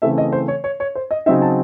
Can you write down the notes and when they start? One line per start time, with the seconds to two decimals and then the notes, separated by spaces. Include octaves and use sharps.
0.02 C#3 E3 A3 C4 E5
0.18 D#5
0.33 C5
0.48 C#5
0.64 C#5
0.80 C#5
0.95 C5
1.11 D#5
1.26 C#3 F#3 C4 D#4 E5
1.42 A5